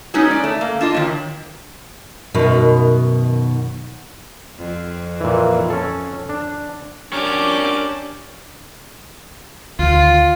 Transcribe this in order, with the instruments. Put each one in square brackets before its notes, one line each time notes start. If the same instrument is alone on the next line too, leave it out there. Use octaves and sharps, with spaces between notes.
[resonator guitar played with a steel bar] F#3 G#3 B3 C#4 D#4
D5
A3
A#3
D4 F4 D#5
D#3 F#3
[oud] F#2 B2 D#3
[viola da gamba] F2
[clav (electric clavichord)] A#2 E3
C#4 A4
D4
[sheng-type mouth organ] C#4 G4 A5 [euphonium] D4 [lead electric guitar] A#4 C#5 [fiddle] D6
[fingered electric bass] D2 D#3 [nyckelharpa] F4